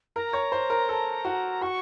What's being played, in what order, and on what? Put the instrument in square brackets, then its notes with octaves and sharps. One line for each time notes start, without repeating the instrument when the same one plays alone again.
[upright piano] A#4 [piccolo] A#5
[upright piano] C#5
C5
A#4
A4
F#4
[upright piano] F#4 [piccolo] C#6